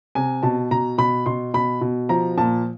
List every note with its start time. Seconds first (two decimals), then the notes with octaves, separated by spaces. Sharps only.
0.15 C3 G#5
0.43 B2 A5
0.71 B2 A#5
0.98 B2 B5
1.26 B2 C6
1.54 B2 B5
1.81 B2
2.09 F3 A#5
2.38 A#2 A5